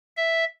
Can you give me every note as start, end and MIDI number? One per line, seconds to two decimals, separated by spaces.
0.17 0.45 76